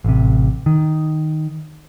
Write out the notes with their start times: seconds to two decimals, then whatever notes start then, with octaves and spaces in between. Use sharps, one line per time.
0.04 A1 C3
0.66 D#3